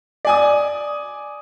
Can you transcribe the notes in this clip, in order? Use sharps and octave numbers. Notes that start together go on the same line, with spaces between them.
D5 G#5 D#6